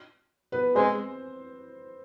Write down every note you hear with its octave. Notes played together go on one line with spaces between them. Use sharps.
B3 B4
G#3 C4 C5